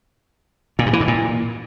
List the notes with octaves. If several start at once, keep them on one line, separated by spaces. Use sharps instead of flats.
A#2
G2
E3
G#2
A#2